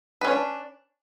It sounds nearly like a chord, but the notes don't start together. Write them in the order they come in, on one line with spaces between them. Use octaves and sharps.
B4 C#4 C#5 D4